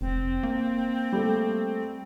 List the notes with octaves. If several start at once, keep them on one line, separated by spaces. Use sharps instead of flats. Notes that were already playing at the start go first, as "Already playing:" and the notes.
F1 C4
A#3
G3 A3